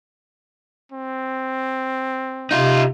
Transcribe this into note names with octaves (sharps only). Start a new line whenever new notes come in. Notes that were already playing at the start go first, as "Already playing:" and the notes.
C4
C3 D#4 F4